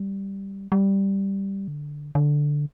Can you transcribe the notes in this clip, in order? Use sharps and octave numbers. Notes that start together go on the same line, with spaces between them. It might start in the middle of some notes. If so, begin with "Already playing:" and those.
Already playing: G3
G3
D3
D3